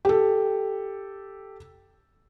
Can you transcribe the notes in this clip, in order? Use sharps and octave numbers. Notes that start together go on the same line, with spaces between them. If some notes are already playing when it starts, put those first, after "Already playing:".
G4 A4